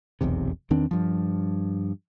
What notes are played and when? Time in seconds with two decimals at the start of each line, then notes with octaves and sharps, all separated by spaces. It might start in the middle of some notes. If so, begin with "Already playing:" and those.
0.21 F1 B1 E2 C3
0.70 E2 D#3 C4 D4
0.91 G2 F3